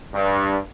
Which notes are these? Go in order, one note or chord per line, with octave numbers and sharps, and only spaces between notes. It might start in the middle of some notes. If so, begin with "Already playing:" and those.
G2